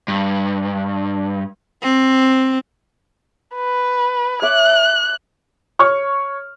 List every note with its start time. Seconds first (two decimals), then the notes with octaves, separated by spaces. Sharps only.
0.08 G2
1.83 C4
3.55 B4
4.42 C#5 E5 D6 F#6
5.79 C#5 C#6 F6